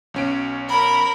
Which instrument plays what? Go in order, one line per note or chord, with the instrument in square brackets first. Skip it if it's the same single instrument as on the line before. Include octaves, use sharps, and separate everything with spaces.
[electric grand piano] B1 C#4 D7
[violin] A#4 B5